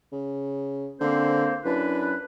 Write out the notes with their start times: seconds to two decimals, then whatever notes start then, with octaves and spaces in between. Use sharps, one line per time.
0.12 C#3
1.01 D3 A#3 C4 C5
1.65 F#2 D4 E4 B4